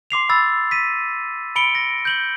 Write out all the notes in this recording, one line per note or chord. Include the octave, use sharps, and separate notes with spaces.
C6 D6 C7 F7
B5 E6 A6
B6 D#7
B5 C#7 D7 G7
A#6
G6 F#7 G7